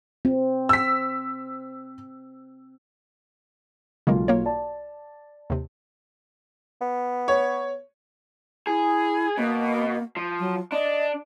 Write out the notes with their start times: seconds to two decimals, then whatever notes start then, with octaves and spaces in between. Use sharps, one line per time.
0.25 C4
0.69 E6 B6
4.07 B1 C#3 G#3 A#3 F4
4.28 A#3 C#5
4.46 D5 A5
5.50 D#2 C3
6.81 B3
7.28 C#5
8.67 E4 G#4
9.37 B2 A#3
10.17 F3
10.39 F#3
10.72 D4 D#5